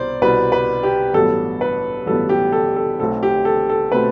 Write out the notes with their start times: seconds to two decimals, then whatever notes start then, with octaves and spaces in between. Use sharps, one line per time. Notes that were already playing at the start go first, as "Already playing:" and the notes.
Already playing: C2 B2 B3 C5 D5
0.22 C2 B2 G3 B3 B4
0.52 B4
0.83 G4
1.14 A1 G2 F#3 B3 A4
1.61 B4
2.06 A1 G2 F#3 B3 A4
2.29 G4
2.52 A4
2.76 A4
2.99 B1 B2 A3 C4 A4
3.23 G4
3.45 A4
3.69 A4
3.92 B2 A3 C4 B4